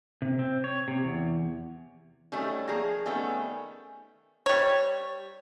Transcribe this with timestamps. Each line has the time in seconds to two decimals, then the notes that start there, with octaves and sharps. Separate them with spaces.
0.22 C3
0.39 C4
0.64 C#5
0.88 C3
1.04 E2
2.32 D#3 F#3 G3 A3 C#4
2.68 F3 A#3 G#4 A#5
3.06 D#3 G3 A3 B3 C#4
4.46 G3 C#5